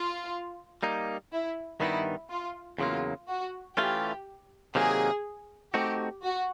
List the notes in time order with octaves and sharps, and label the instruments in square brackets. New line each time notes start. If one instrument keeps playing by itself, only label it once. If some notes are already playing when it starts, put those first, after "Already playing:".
Already playing: [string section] F4
[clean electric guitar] G3 A#3 D#4
[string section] E4
[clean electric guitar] G2 D#3 G3 B3 D#4 [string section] E4
[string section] F4
[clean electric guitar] E2 C#3 F#3 A#3 [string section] F4
[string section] F#4
[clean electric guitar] E3 A3 C#4 F4 [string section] G4
[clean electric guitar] C3 D#3 F#3 A#3 [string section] G#4
[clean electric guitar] A3 C4 D#4 F#4 [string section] G4
[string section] F#4